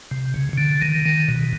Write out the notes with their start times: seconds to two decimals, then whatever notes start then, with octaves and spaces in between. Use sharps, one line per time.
0.11 C3
0.34 C#3
0.53 C#3
0.58 D3
0.81 D#3
1.06 D#3
1.28 B2